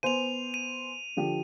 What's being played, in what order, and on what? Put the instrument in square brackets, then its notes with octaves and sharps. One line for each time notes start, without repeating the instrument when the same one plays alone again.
[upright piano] B3 C5 G#5 [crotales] D#7 F7
[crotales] D#7
[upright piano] D3 F3 G4